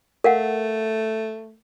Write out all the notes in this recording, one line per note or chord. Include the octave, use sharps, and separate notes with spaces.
A3 A#4 F5 F#5